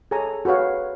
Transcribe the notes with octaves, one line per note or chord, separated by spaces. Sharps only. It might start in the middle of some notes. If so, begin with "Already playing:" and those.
G#4 A4 C#5 G#5 A#5
F#4 G#4 B4 C#5 F5